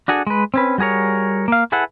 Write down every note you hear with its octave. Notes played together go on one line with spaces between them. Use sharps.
D4 F#4 G#4 A4
G#3 B4
C4 C#4 B4
G3 F#4 G#4 A#4 C#5
A#3 F5
E4 G#4 A4 B4 F#5